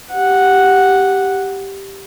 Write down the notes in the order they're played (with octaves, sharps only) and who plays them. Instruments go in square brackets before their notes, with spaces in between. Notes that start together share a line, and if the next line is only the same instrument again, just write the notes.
[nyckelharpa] G4 F#5